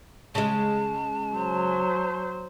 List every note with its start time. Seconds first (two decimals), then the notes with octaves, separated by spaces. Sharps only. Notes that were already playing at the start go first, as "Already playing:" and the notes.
0.35 C#3 G#3 A5
1.36 F#3 C5